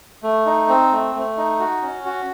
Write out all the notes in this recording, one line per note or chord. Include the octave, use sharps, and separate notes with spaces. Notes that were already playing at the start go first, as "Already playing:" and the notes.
A3
D#4
C4
A3
A3
D#4
F#4
C#4
F#4